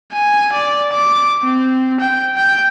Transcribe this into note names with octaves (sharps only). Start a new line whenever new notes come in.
G#5
D5
D6
C4
G5
G5